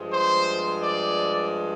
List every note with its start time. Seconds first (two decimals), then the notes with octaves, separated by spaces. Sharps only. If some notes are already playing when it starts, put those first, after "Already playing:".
Already playing: G2 F3 G#3
0.12 C5
0.83 D5